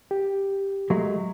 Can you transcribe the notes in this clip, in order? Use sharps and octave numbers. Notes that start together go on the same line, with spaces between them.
G4
F#3 G#3 A3